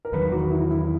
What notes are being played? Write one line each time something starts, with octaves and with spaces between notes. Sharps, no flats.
A#4
E2 D#3 F#3 B4
F#4
E4
E4